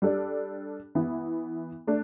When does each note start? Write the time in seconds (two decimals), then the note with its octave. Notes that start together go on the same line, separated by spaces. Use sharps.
0.02 G3 D4 A4 D5
0.95 E3 B3 E4
1.87 A3 D4